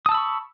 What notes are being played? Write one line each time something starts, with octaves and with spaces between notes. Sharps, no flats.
A5 B5 C#6 D#6 E6